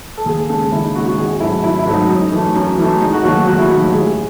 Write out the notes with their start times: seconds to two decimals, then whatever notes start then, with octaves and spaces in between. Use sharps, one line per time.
0.17 A4
0.26 D#2 G#4
0.49 C#3 G#3 A4
0.72 D#2 E4
0.84 D#4
0.95 C#3 F#4
0.98 G#3
1.06 F#4
1.18 G#1 G#4
1.40 G#2 F#3 A3 E4
1.64 G#1 E4
1.79 E4
1.86 G#2 F#3 A3
1.94 D#4
2.09 F#2 D#4
2.32 E3 A3
2.56 F#2
2.78 E3 A3
3.01 E1 D#4
3.13 F#4
3.24 D#2 D#3 F#3 A3 F#4
3.47 E1 F#4
3.59 E4
3.70 D#2 D#3 F#3 A3 D#4
3.81 F#4
3.93 A1 G#4